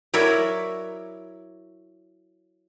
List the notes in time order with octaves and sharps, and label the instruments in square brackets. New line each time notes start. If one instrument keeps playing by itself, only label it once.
[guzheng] F#3 E4 A#4 C#5 D5